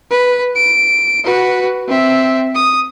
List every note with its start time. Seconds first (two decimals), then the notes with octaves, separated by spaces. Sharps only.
0.11 B4
0.56 D7
1.24 F#4 B4
1.88 C4 E5
2.55 D#6